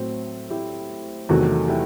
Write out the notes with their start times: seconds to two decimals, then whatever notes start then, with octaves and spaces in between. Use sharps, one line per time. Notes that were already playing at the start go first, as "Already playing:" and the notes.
Already playing: A2 F#3 C4
0.50 E4 G4
1.29 E2 C3 D#3 F#3 A3 F#4
1.68 E4 G4